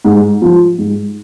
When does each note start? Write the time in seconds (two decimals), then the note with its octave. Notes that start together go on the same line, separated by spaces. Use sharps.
0.05 G#2
0.42 F3
0.78 G#2